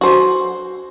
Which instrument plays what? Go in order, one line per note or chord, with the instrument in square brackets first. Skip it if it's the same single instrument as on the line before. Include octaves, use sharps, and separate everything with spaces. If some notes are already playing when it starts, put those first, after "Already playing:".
[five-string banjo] F#4 C5